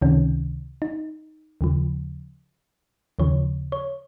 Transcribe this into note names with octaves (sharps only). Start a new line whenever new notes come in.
C#2 C3 D#3 C#4
D#4
D#2 C#3 F3
D#2 C#3 F3 C#5
C#5